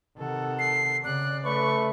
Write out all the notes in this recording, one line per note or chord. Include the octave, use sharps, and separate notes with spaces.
C3 D#3 A4 F#5
C7
C#3 D5 F#6
A3 B4 C#6